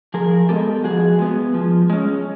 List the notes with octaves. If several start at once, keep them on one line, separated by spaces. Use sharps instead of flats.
F3 G#4 A#4
G#3 B3 G4 A4
F3 F#4 G#4
G#3 B3
F3
G#3 C#4